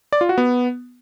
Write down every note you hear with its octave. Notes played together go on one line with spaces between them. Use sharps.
D5
F4
F#4
B3